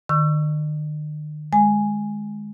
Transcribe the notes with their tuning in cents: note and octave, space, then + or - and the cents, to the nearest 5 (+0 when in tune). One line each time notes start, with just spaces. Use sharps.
D#3 -45 C#6 +0 E6 +30
G#3 +0 G#5 +0